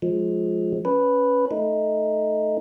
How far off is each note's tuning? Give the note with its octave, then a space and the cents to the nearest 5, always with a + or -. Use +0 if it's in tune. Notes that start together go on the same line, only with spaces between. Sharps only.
F3 +15 G#3 +15
C#4 +5 B4 +0
A3 +0 D#4 +0